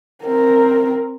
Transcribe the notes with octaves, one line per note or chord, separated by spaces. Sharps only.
C4 A#4